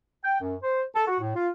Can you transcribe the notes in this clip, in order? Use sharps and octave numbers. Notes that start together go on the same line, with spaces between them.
G5
F#2
C5
A4
F#4
A2
F4